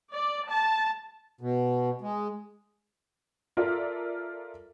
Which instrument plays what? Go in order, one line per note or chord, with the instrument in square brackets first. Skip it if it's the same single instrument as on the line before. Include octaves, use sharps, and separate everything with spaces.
[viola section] D5
A5
[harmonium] B2
G#3
[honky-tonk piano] F4 A4 A#4 D5 E5